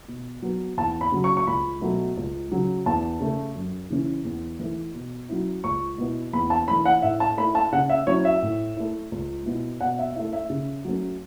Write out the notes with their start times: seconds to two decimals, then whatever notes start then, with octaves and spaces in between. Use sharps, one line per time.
0.08 B2
0.42 F#3 B3
0.77 E2 A5
1.01 B5
1.12 C#3 F#3
1.24 C#6
1.37 C#6
1.47 C#2 B5
1.81 B2 F#3 A3
2.17 C#2
2.52 C#3 F#3
2.86 E2 A5
3.20 C#3 A3
3.55 F#2
3.90 C#3 E3 C#4
4.25 E2
4.59 E3 A3 E4
4.95 B2
5.29 F#3 C#4 E4
5.64 C#2 C#6
5.98 B2 B3 E4
6.33 E2 B5
6.50 A5
6.68 E3 A3 B5
6.85 F#5
7.02 A2 E5
7.20 A5
7.37 A3 E4 B5
7.55 A5
7.72 C#3 F#5
7.90 E5
8.07 F#3 C#4 E4 C#5
8.25 E5
8.42 A2
8.77 A3 E4
9.12 C#2
9.46 B2 B3 E4
9.80 B2 F#5
9.99 E5
10.15 A3 E4 E5
10.33 E5
10.50 C#3
10.85 F#3 A3 C#4